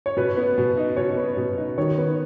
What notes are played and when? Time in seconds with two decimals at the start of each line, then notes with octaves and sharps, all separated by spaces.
0.06 C#5
0.17 B2 B4
0.37 B3
0.58 B2
0.77 D#4
0.97 B2 C#5
1.17 B3
1.37 B2
1.58 D#4
1.78 D#3 C#5
1.98 B3